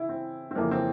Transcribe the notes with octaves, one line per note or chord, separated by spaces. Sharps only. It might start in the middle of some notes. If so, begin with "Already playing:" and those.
Already playing: C#3 E3 E4
C4
C4
F2 C#3 E3 A#3
C4